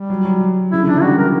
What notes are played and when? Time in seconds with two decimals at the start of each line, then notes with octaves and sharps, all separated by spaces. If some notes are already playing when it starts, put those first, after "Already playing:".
Already playing: G3
0.10 F#3
0.25 F#3
0.72 C#3 E4
0.81 D3
0.87 E3 D4
0.95 F#3
1.02 G3 F#4
1.18 A#4